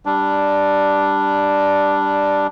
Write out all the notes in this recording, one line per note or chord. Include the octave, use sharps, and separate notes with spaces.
G3 D4